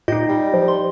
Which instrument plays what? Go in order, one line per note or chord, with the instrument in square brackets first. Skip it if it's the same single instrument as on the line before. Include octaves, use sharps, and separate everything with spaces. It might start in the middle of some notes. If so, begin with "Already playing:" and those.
[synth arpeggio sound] A#2 [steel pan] D#4 G4 [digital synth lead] D#5
[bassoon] G3
[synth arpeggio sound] F3
[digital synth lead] C6